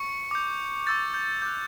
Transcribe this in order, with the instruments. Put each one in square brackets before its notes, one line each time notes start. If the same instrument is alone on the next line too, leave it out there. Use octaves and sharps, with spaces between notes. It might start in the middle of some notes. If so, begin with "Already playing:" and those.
Already playing: [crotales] C#6 C#7
D6 G6
C#6 E6 G6 A6
G6
D6 F#6 G6